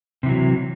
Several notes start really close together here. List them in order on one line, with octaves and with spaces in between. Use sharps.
C3 E3 F#3